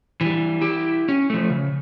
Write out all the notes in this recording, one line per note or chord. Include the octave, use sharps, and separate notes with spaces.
E3 G3
E4 G4
C#4
F3 A3
C#3